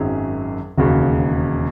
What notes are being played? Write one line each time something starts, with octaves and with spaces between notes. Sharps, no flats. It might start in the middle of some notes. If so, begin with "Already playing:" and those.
Already playing: G#1 F#2 D#3 F#3 G#4
E1 D#2 C#3 F#4